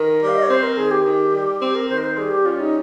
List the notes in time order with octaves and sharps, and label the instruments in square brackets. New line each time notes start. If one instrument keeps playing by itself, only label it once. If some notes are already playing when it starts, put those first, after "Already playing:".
Already playing: [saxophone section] D#3 [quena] A#4
[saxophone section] G3
[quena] F5
D#5
C#5
[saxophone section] C4 [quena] C5
[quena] A#4
[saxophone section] D#3 [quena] G#4
[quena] G4
[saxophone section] D#3
G3
[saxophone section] C4 [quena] G4
[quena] A#4
[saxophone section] D#3 [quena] C5
[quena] A#4
C5
[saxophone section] G3 [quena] G#4
[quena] G4
[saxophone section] C#4 [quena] F4
[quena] D#4